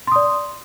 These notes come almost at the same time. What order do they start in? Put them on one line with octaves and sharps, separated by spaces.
C6 D#6 D5